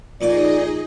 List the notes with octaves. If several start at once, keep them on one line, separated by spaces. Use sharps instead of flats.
F2 A#2 D#4 G#4 D5 D#5 D6